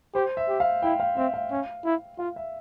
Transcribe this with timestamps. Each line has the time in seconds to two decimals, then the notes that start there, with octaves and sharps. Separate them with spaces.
0.14 G4 C5
0.37 E5
0.49 G4
0.60 F5
0.82 E4 G5
1.00 F5
1.17 C4 E5
1.34 F5
1.51 C#4
1.85 E4
2.19 F4 F5
2.36 E5